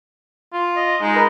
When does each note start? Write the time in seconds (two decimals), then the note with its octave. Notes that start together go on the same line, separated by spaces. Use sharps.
0.53 F4
0.76 D#5
1.01 G#3 D#4
1.15 A#4 B4 D#5